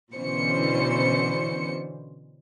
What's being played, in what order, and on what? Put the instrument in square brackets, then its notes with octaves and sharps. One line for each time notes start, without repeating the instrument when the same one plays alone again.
[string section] B2 D3 E3 C#4 C5 C#7